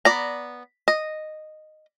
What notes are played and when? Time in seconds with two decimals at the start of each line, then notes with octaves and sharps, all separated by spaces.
0.05 B3 D5 A#5
0.88 D#5